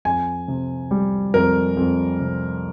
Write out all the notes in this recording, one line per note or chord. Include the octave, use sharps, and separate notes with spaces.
F2 G#5
C3
G3
F2 A#4
F2
C3